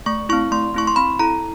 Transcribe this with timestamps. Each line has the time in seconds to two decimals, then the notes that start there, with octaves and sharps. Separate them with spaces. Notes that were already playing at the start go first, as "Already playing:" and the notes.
0.06 A3 C#6
0.29 E4 C#6
0.33 C4
0.52 A3 C6
0.74 C4 E4 C#6
0.87 C6
0.96 C4 B5
1.19 E4 A4 A#5